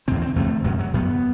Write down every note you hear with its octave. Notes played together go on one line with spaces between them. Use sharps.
E2 C3 C4
C4
E2 C3 A3
F#2 F#3
F#3
F#2 B3